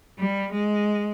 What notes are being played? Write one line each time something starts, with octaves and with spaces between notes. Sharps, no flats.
G3
G#3